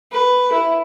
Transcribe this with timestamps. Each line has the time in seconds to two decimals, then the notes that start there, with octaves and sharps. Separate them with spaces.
0.11 B4
0.52 E4